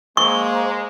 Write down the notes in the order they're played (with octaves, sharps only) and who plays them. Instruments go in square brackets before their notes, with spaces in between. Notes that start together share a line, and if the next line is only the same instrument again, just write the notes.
[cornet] G#3 [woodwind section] A#3 [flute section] C5 A#5 D6 [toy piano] C#6